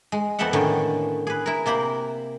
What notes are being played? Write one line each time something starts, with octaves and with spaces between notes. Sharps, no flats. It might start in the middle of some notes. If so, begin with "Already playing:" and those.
G#3
F2 B3 C4 A4 E5 F#5
A2 D3 D#3 C#4 G5
G#4 B4
E4 A#4
C3 A#3 C5 B5